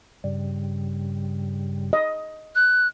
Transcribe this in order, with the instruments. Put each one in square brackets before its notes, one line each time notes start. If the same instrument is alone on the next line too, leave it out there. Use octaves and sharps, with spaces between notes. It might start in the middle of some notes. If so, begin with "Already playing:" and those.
[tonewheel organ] G2 C#3 G3
[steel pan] D#5
[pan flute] F#6